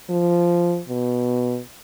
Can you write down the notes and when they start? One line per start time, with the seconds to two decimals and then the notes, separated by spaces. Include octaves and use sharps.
0.10 F3
0.89 B2